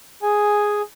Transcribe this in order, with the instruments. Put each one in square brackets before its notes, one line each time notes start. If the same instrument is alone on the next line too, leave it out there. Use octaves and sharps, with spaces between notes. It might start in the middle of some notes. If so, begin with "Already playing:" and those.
[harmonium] G#4 G#5